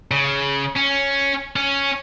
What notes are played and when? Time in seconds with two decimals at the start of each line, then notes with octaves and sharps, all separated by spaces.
0.11 C#3
0.76 C#4
1.56 C#4